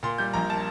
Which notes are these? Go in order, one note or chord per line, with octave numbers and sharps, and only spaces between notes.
A#2 C6
G3 G6
A#1 A#5
A#3 A5